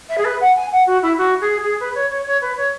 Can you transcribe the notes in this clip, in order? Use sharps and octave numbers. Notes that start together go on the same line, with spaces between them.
E5
G#4
B4
F#5
G#5
F#5
F#4
E4
F#4
G#4
G#4
B4
C#5
C#5
C#5
B4
C#5